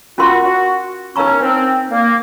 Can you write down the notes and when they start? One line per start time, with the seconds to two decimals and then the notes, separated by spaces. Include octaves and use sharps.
0.18 C#4 F4 F#4 A#4 F5 C6
0.43 F#4
1.16 C#4 D#4 A#4 F5 A#5 C#6
1.41 C4
1.89 A#3